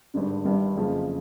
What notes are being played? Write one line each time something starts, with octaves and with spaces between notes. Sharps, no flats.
G#1 G2 D3
G1 G2 D#3
F#1 F2 C#3 F3 G#3